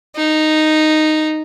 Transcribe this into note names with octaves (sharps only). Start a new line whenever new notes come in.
D#4